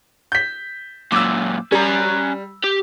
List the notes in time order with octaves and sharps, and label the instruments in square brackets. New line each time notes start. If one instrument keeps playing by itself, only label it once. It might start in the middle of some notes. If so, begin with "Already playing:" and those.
[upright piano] G6 B6
[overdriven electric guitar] F#2 A#2 [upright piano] D6 E6
[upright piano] G3 [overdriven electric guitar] C#4 A#5
[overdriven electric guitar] G4